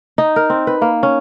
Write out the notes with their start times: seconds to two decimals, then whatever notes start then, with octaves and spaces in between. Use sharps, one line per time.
0.18 D#4
0.36 A#4
0.50 C4
0.67 B4
0.82 A#3
1.03 C#4